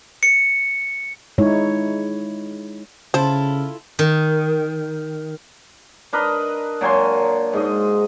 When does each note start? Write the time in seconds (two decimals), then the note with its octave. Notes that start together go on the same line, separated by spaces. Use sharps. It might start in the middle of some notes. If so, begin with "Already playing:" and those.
0.23 C#7
1.38 G#3 D#4 E4 C#5
3.14 C#3 E4 F4 A4 C5
3.99 D#3
6.13 D4 A#4 B4 D#5
6.81 A#2 F#3 G#5 C6
7.53 G#2 D#5